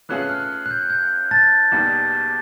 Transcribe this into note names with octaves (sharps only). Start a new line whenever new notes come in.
E3 A3 C#4 F4 G#4 F#6
F#6
F6
F#6
F6
F#6
G6
G6
A5 A6
E2 B2 G3 A#3 D#4